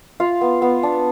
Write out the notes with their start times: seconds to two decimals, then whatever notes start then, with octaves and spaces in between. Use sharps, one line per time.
0.20 F4 F5
0.41 B3
0.62 B3
0.83 D4